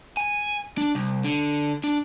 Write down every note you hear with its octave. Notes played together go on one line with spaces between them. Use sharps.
G#5
D4
C2
D3
D4